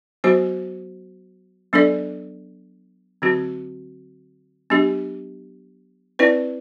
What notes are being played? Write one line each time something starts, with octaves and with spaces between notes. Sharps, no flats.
F#3 B3 F#4 C5
F#3 B3 D4 A4 D5
D3 F#3 C4 F#4
F#3 B3 D4 G4
C4 E4 B4 D5